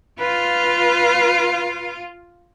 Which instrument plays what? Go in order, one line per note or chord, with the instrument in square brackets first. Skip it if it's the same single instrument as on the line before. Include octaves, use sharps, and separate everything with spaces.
[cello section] F4 [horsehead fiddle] B4